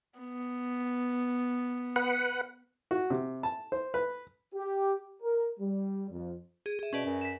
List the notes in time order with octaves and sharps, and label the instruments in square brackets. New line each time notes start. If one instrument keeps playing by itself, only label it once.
[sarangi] B3
[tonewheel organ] B4 F#5
[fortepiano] F#4
C3
A5
C5
B4
[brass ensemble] G4
A#4
G3
F2
[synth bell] G#4
G#4 E5
[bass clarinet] B2 [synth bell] C#4 B4 D5
[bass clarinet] F#2
[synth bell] B6 E7